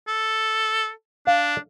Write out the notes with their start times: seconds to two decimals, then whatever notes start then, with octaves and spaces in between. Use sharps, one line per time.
0.08 A4
1.27 D4 F5